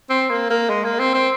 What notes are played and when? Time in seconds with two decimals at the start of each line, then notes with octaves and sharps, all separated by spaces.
0.10 C4
0.30 A#3
0.50 A#3
0.70 G#3
0.85 A#3
1.00 C4
1.14 C4